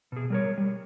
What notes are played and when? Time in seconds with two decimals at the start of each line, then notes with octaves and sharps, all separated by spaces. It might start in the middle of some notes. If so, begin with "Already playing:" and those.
0.12 B2 G#4
0.30 G3 A#4 C#5
0.58 G3